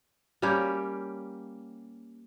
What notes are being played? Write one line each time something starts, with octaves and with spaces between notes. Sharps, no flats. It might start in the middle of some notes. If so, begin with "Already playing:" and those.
G3 A#3 C#4 G4